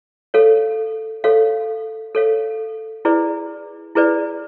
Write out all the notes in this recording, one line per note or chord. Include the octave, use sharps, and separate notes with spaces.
A4 C#5 F5
A4 C#5 F5
A4 C#5 F5
E4 G#4 B4 D5
E4 G#4 B4 D5